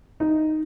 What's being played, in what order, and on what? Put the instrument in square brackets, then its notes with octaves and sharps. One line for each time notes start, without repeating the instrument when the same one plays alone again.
[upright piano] D#4